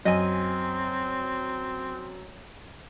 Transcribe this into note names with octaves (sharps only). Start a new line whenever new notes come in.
F#2 C4 D#5 G#5